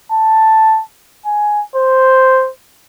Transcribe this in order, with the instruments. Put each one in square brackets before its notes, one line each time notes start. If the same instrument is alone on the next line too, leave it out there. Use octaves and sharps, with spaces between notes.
[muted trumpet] A5
G#5
C5